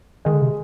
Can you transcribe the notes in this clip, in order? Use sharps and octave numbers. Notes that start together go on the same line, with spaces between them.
D#3 G#3
D3
C3